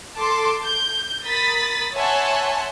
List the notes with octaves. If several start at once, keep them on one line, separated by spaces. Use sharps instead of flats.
A4 A5 C6 D6
G6
A#4 B5 D#6 A6 B6
C#5 E5 F#5 G#5 A5 C6